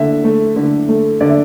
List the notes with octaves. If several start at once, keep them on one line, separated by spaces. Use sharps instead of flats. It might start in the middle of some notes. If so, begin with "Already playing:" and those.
Already playing: D3 A3 E5
A3
D3
A3
D3 D5
E5